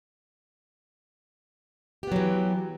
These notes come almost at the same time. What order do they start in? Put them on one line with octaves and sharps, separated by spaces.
G4 B3 F#3 E3